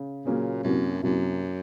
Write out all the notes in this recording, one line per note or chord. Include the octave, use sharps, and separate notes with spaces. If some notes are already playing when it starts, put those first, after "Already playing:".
Already playing: C#3
A#2 C#3 F#3 A#3 C#4 G#4
C2 F#2 C3 F#3 A#3
C2 F#2 C3 F#3 A#3